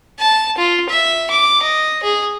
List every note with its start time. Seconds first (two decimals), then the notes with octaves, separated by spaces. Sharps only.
0.19 A5
0.58 F4
0.89 E5
1.30 D6
1.62 D#5
2.03 G#4